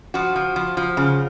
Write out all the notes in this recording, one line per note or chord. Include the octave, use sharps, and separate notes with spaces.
F3 F#4
F3
F3
F3
C#3